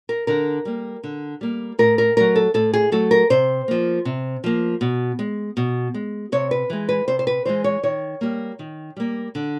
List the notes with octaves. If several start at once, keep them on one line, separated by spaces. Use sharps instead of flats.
A#4
D3 A#4
G3 A#3
D3
G3 A#3
A2 A#4
A#4
F#3 A3 A#4
A4
A2 A4
G#4
F#3 A3 A4
A#4
C3 C5
F3 A#3
C3
F3 A#3
B2
G#3
B2
G#3
C3 C#5
B4
E3 G#3
B4
C3 C5
C5
B4
E3 G#3 C5
C#5
D#3 C#5
G3 A#3
D#3
G3 A#3
D3